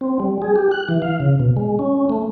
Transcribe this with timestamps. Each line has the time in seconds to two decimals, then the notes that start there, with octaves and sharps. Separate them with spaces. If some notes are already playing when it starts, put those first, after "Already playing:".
0.01 C4
0.20 G3
0.42 G#4
0.56 G4
0.71 F#6
0.89 E3
1.02 F5
1.20 C#3
1.39 B2
1.57 G#3
1.79 C#4
2.10 A3